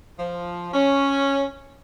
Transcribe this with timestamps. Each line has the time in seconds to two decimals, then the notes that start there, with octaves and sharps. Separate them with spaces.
0.19 F3
0.74 C#4